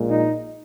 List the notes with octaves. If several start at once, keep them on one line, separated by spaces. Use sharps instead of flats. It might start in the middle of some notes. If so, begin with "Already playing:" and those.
Already playing: A#1 A#2 G#3
D#4